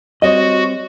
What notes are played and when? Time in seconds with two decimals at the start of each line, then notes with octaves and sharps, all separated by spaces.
0.22 G3 C4 F#4 C#5 D#5